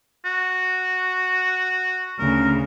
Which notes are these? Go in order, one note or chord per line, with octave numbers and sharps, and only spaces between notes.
F#4
D2 C#3 A#4